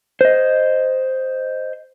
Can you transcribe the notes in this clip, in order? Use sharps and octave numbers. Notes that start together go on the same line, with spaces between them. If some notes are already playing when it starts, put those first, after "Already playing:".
C5 D#5